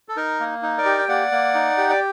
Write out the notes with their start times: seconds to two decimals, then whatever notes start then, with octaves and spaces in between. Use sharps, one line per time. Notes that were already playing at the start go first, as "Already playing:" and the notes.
0.09 A4
0.16 D#4 A#4
0.40 A#3
0.62 D#4
0.78 A#4 D5
0.85 G4
0.98 G5
1.08 A#3 D5 F#5
1.32 A#3
1.55 D#4
1.77 G4
1.89 D5